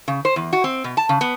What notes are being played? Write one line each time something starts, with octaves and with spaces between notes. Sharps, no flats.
C#3
C5
E2
F#4
C4
B2
A5
C#3
B3